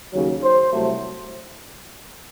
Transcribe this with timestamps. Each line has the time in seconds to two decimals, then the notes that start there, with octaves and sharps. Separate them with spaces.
0.12 D#2 C#3 F#3
0.42 C5
0.72 C2 C3 F#3 A3